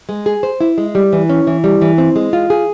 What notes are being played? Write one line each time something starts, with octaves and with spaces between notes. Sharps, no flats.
G#3
G#4
C5
E4
G#3
G3
E3
C#4
E3
G3
E3
C4
G#3
F4
G#4